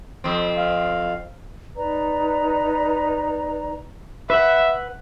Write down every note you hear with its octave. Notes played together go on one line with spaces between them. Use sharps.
F2 C4
F5
D#4 B4 D5 A#5
B4 E5 F#5